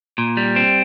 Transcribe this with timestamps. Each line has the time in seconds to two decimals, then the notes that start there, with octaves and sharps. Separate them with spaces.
0.18 A#2
0.37 G3
0.56 C4